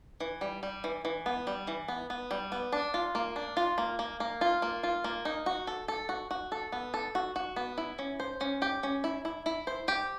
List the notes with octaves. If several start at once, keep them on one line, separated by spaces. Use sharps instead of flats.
E3
G3
G3
E3
E3
B3
G3
E3
B3
B3
G3
B3
D4
F4
A#3
D4
F4
A#3
A#3
A#3
F4
A#3
F4
A#3
D#4
F#4
A4
A4
F#4
F#4
A4
B3
A4
F#4
F#4
B3
E4
C#4
C5
C#4
G4
C#4
E4
E4
E4
C5
G4